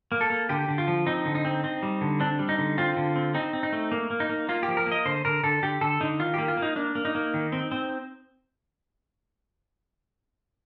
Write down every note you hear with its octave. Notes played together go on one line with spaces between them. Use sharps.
A#3
A4
A#3
D3 G4
D3
F4
F3
C4 D#4
D3
D#4
C4
C4
G3
D3
C4 D4
G3
D#4
D3
C4 F4
D3
C4
C4 D#4
C4
D#4
A3
A#3
A#3
D#4
A#3
A#3 F4
G4
F3
A#4
A#3
D#5
D3 C5
D3 A#4
D3 A4
D3 G4
D3 A4
D3 D#4
D#3 F4
A#3 G4
F4
A#3 D#4
A#3 D4
A#3
D#4
A#3
D#3
C4
C4